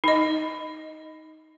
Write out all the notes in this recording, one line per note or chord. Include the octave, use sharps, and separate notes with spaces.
D#4 D#5